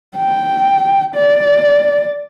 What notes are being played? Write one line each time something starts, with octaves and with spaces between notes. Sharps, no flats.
G5
D5